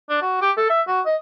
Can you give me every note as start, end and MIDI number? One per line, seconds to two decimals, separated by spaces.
0.10 0.18 62
0.22 0.40 66
0.41 0.51 67
0.57 0.67 69
0.70 0.82 76
0.88 1.01 66
1.06 1.16 75